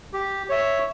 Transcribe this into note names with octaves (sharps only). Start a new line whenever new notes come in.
G4
C#5 E5